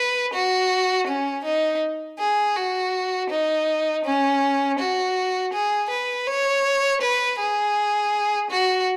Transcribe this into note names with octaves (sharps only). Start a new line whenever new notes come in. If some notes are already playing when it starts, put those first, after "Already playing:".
Already playing: B4
F#4
C#4
D#4
G#4
F#4
D#4
C#4
F#4
G#4
B4
C#5
B4
G#4
F#4